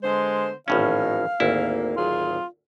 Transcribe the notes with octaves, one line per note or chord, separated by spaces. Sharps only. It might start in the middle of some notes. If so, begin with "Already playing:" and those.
D3 G#3 B3 C5
G#1 A2 E3 F3 C#4 D#4 F5
G#1 D2 A#3 E4
F#3 C4 F4 G#4